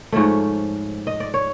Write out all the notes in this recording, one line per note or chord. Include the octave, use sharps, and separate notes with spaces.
G#2 F3 A3 C#5
D#5
D5
C#5